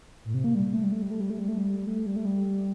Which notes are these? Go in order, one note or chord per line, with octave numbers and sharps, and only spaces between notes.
A2
C3
A#3
G3
G3
A3
G3
A3
G3
A3
G3
A3
G3
A3
G3
A3
G3
A3
G3